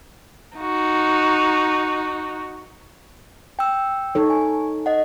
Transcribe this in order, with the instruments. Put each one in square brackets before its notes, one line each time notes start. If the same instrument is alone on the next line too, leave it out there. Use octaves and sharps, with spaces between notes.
[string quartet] D#4 F#4
[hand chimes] G5 E6
[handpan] D#4 A4 C#5
[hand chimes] G#5
D#5 F#5